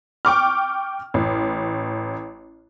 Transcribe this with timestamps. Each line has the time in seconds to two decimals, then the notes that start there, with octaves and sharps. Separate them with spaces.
0.25 G5 C#6 D6 F6
1.14 A1